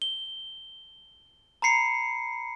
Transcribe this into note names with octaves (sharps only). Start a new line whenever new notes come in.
G7
A#5 B5 C7 C#7